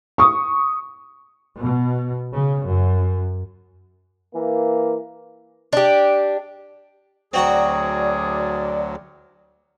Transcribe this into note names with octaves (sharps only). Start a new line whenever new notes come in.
C#6 D#6
B2
C#3
F#2
E3 A#3
D4 G4
D2 F#3 C4 F#4 G#4 D5 A#5